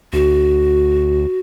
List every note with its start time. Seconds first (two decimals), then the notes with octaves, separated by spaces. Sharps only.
0.13 D2 F#4